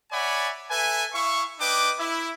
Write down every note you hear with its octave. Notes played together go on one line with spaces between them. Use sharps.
C#5 D5 E5 F#5 G#5 B5
A4 B4 E5 G#5
E4 E5 F5 C#6
D4 B4 D#5 G5 D6
E4